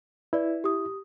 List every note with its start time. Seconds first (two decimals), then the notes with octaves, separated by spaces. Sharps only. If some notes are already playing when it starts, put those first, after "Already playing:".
0.33 E4 B4 D5
0.64 G4 D#6